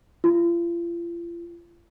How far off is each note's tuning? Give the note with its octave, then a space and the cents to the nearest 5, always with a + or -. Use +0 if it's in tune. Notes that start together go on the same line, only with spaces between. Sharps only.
F4 -40